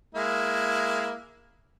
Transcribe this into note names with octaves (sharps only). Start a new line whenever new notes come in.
G#3 A#3 E4